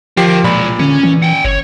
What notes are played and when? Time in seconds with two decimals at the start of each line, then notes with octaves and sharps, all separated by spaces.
0.17 F3 G4 A#4 G5 C7
0.44 B1 A#2 G#3 D5 B5
0.80 D3 C#4
1.03 E3
1.23 F#5 G5
1.45 G1 C#5